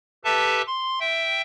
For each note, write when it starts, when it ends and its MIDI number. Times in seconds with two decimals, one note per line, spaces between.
0.24 0.62 67
0.24 0.62 69
0.24 0.62 71
0.24 0.62 76
0.24 0.62 81
0.67 0.99 84
1.00 1.42 76
1.00 1.42 79